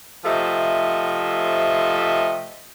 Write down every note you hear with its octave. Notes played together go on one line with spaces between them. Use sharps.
C3 F3 A3 D#5 E5